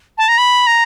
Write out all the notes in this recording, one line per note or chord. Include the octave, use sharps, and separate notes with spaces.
A5
A#5
B5
A#5